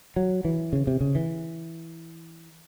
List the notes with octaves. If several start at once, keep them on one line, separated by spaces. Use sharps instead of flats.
F#3
E3
C#3
C3
C#3
E3